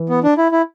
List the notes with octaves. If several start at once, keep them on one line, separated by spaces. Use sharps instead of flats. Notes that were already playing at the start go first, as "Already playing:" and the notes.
Already playing: E3
B3
D4
E4
E4